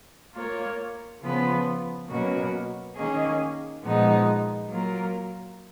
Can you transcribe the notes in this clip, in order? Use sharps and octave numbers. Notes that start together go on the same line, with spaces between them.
A#3 F4 A#4 C#5
C#3 F3 B3 F4 B4
B2 F#3 A#3 C#4 F#4
D#3 A#3 C#4 G#4 D#5
A#2 F3 G#3 B3 D#4
F#3 A#3 F4 A#4